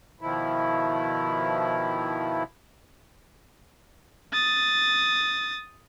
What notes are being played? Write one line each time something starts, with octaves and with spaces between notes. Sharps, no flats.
B2 D#3 F3 E4
D#6 A6